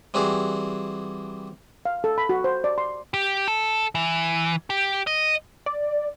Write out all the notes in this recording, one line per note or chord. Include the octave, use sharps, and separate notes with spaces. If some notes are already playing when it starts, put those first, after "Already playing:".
E3 G3 C4 F#4 G#4
F5
A4
B5
F#4
C5
D5
C6
G4
A4
E3
G4
D#5
D5